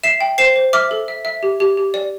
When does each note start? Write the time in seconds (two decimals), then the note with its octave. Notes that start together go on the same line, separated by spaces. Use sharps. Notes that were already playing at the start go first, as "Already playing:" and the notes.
0.03 E5 C7 E7
0.21 G5
0.38 C5 C7 E7
0.56 C5
0.73 E5 D6 F6
0.91 A4
1.08 E5
1.25 E5
1.43 G4
1.60 G4
1.77 G4
1.94 D5